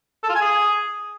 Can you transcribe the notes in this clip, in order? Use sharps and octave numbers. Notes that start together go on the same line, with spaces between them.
A4
F4
G#5
G#4